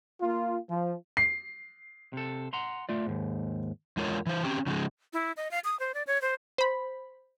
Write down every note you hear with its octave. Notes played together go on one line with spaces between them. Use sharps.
A#3 F4
F3
C7
C3 A4
F#5 A#5 C6
A3 F4 D5
D#2 G#2
E2 G#3 F4 A#4 C#5
E3 C5
C4 C#4 G4
C#3 F3 F#3 G#3
E4
D#5
F5
D#6
C5
D5
C#5
C5
C5 B5